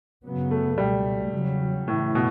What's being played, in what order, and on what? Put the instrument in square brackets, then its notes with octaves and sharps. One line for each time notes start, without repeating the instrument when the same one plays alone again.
[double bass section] F#2 C#3 F#3 B3
[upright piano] A3
[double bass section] C#2 B2 A3 [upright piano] G3
[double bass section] E2 C#3 F#3
[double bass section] F#2 C#3 E3 A3 [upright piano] A2
[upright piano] B2